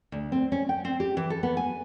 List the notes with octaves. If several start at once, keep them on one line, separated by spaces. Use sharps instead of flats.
D2
C4
C#4
G5
C4
G4
E3
A4
B3
G#5